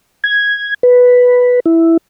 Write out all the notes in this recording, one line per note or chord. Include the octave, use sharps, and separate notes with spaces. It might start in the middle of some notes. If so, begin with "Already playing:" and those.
G#6
B4
E4